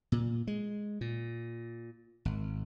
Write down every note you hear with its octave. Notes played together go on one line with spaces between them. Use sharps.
A#2
G#3
A#2
G#1